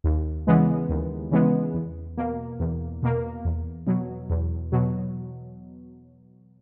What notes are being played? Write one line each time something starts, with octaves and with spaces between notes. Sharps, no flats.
D#2
C#3 E3 G#3 B3
D#2
C#3 E3 G#3 B3
E2
B2 A#3
E2
B2 A#3
E2
B2 F#3
E2
B2 F#3